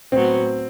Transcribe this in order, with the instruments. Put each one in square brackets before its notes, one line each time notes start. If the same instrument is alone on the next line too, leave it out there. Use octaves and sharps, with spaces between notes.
[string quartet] A2 F#3 B3 [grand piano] C4